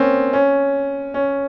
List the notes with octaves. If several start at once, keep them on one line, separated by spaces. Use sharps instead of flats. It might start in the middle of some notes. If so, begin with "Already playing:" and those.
Already playing: A#3 C4 C#4
C#4
C#4